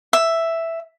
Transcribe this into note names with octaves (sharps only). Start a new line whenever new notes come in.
E5